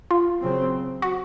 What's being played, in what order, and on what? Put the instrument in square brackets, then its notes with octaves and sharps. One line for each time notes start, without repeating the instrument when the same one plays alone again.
[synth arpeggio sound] F4
[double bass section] C#3 F#3 C4
[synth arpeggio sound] F#4